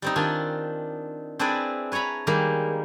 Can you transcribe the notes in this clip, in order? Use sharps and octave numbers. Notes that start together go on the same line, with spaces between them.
G3 C4 D#4
D#3 D4 F4 G#5
C4 D4 E4 G#4 B4 D5
B4 C#5 G#5 A#5 B5
D#3 G3 G#3 A#3